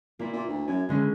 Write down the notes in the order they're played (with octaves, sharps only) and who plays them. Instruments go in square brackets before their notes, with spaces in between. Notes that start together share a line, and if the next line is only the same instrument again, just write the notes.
[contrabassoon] A#2 [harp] A#3 E4
[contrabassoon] A#2
D2
[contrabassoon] F#2 [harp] G#5 G#6
[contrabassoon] C#2 [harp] D3 G#3 C#4